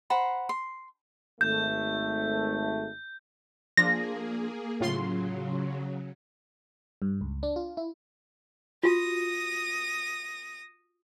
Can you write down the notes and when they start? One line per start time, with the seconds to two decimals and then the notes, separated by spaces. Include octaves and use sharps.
0.10 C5 F#5 A#5 B5
0.49 C6
1.41 G#1 A3 G6
3.77 F3 A#3 D4 F4 G#4 A#6
4.80 A2 C#3 F#3 F4 C6
7.02 G2
7.21 C#2
7.43 D4
7.56 F4
7.77 E4
8.83 F4 F#4 D#6 A#6